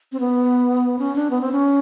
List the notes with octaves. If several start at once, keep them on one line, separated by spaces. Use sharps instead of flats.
C4
B3
C#4
D4
B3
C4
C#4